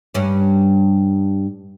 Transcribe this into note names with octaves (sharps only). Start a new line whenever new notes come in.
G2 C#4